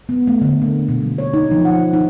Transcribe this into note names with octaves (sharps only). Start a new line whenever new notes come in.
B3
A3
D3
A#3
B2
G3
C#5
D#4
F3
F#5
D#4